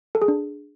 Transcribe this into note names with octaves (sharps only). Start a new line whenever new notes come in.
A4
G#4
D4